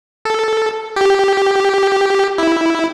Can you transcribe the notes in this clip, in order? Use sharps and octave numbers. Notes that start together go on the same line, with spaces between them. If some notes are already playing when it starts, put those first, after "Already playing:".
A4
G4
E4